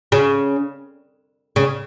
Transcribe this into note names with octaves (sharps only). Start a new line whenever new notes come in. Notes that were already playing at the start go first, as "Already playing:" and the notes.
C#3
C#3